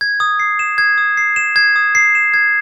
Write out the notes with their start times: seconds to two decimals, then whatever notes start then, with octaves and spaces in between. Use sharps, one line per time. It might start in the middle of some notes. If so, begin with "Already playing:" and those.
0.01 G#6
0.20 D#6
0.40 C7
0.59 E7
0.78 G#6
0.98 D#6
1.17 C7
1.36 E7
1.56 G#6
1.76 D#6
1.95 C7
2.15 E7
2.34 G#6